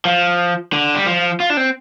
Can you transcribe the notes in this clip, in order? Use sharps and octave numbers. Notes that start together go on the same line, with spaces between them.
F3
D3
G3
F3
F4
D4
C4